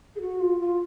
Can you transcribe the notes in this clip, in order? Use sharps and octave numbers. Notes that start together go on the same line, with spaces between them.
G#4
F#4
F4
F4